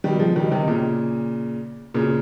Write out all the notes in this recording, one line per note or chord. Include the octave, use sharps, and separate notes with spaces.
D#3 G3
F3 G#3
D#3 G3
C3 D#3
A#2 C#3
A#2 C#3